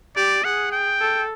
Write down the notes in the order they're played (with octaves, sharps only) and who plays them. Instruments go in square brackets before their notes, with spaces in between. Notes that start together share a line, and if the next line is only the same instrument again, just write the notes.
[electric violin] G4 [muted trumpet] D5
[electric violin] G#4 [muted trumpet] F#5
[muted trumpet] G5
[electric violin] A4